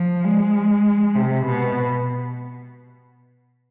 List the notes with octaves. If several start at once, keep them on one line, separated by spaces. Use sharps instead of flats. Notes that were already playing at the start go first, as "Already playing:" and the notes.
Already playing: F3
G#3
C3
B2